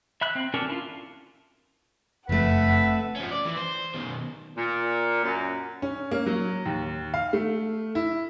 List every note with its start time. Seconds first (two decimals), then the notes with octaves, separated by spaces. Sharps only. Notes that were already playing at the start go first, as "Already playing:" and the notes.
0.21 E5 B5 F#6
0.35 C4
0.54 C#4 D4 F#4 A4 A#4
0.70 E4 F4
2.29 F#1 F2 A3 B4 E5 F#5
3.16 F3 C#4
3.31 D5
3.45 E3
3.57 C5
3.94 B2 D#3
4.57 A#2
5.24 F#2
5.82 C#4
6.11 A#3
6.26 F#3
6.66 D#2
7.14 F5
7.33 A3
7.95 E4